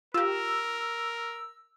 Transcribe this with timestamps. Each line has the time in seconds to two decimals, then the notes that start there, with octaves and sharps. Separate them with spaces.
0.14 F4 G4 A#4 E6